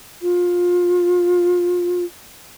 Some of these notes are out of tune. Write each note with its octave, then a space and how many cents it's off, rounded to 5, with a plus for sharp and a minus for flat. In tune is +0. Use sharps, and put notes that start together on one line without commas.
F4 +20